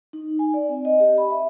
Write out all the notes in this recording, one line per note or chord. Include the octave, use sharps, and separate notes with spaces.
D#4
G#5
D5
C4
D#5
G4
B5
E5